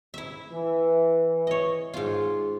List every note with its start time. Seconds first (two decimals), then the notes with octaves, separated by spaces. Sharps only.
0.14 E4 E5
0.53 E3
1.47 C#5 D#5
1.94 G#2 F4